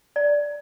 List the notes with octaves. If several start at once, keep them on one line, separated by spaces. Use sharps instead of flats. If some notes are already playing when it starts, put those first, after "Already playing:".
D5